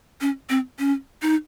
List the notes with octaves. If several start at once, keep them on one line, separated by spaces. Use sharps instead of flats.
C#4
C4
C#4
D#4